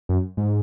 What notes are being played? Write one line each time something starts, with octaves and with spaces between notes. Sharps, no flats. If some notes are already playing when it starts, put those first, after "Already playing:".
F#2
G#2